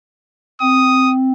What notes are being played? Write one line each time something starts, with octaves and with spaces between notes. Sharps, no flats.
C4 D#6